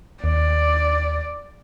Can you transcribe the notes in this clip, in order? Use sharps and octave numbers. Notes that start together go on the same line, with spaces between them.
D#2 D5